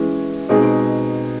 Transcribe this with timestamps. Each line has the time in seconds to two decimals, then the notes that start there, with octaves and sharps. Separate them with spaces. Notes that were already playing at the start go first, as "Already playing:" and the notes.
Already playing: E3 G#3 C#4
0.49 B2 G#3 C4 D#4 G#4